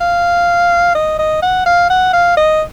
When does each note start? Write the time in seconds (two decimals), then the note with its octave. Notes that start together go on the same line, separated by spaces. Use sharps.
0.01 F5
0.95 D#5
1.19 D#5
1.43 F#5
1.66 F5
1.90 F#5
2.13 F5
2.37 D#5